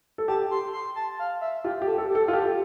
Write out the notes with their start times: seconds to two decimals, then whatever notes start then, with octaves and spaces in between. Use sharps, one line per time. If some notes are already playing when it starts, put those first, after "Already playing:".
0.18 A4
0.28 G4 A5
0.51 C6
0.73 C6
0.96 A5
1.19 F5
1.41 E5
1.64 F4 G4
1.82 G4
1.87 A4
1.98 A4
2.09 G4
2.15 A4
2.28 F4
2.32 G4 A4